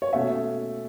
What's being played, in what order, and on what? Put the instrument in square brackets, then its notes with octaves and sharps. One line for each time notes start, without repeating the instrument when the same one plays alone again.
[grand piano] C#5
B2 A3 C#4 E5